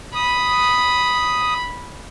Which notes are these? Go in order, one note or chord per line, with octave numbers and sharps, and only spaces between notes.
B5 D#6